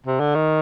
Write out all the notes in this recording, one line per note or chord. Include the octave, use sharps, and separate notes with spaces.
C3
D3
D#3